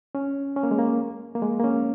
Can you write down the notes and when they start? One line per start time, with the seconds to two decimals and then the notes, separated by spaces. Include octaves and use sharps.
0.15 C#4
0.56 C#4
0.63 A#3
0.71 G#3
0.79 A#3
1.35 A#3
1.42 G#3
1.59 A#3
1.64 C#4